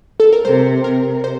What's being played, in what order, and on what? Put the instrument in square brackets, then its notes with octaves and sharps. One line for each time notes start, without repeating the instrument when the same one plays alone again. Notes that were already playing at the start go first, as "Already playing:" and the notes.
[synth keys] A4
A#4
[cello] C3 [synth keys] C5
[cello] C3 [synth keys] A#4
[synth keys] C5